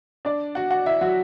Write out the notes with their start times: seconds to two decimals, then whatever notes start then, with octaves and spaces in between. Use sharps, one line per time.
0.25 D4 D5
0.55 F#4 F#5
0.70 F#4 F#5
0.86 E4 E5
1.01 F#3 F#4